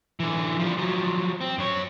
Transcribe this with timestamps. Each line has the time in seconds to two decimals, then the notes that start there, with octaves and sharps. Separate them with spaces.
0.20 D3 E3
0.59 F3 G3
0.77 F3 F#3
1.41 C4
1.58 F#2 C#5